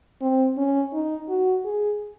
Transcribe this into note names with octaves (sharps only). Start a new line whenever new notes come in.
C4
C#4
D#4
F#4
G#4